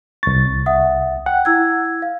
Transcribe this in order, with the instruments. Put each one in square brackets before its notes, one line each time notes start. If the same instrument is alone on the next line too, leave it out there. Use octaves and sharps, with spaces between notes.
[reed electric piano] C2 A6 [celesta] C#6
[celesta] E5 F#5 D#6
[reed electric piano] F#5 [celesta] G5
[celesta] E4 E6 G#6
F5